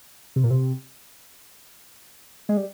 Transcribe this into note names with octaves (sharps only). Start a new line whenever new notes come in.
C3
A#2
C3
G#3
G3